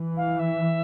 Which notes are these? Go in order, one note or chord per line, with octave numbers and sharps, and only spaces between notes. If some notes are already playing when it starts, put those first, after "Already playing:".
Already playing: E3
F5
E5